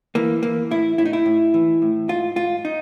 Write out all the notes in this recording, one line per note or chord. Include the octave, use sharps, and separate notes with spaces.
E3 A#3
E3 A#3
A2 E4
A2 E4
D#4
E4
A2
E3
A2
G#2 F4
G#2 F4
D#4